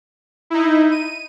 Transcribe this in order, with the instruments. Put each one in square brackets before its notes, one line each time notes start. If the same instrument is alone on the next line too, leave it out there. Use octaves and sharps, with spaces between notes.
[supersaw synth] D#4 E4
D#7